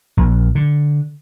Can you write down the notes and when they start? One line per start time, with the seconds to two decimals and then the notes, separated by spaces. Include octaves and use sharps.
0.17 A#1
0.55 D3